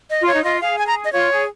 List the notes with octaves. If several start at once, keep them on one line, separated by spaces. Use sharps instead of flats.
D#5
F4
C#5
D#4
F4 D#5
G#4 F5
G#5
A#5
D#5
F4 C#5
G#4